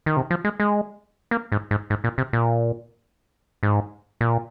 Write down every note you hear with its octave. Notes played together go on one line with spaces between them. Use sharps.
D#3
C3
F3
G#3
G#3
A#3
G#2
G#2
G#2
A#2
C3
A#2
G#2
A#2